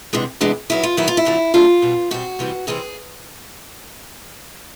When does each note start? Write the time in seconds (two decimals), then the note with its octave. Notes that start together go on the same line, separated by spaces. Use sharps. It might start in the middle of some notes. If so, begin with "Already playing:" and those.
0.13 C3 E3 G#3 B3 D4
0.41 C3 E3 G#3 B3 D4
0.70 D#3 F#3 B3 E4
0.83 F4
0.97 D#3 F#3 B3 E4
1.08 F4
1.17 E4
1.25 F2 D3 F#3 A3 D4
1.54 F2 D3 F#3 A3 D4 F4
1.82 B2 G3 C4
2.11 B2 G3 C4 F#4
2.39 C3 E3 G3 C4
2.67 C3 E3 G3 C4 G#4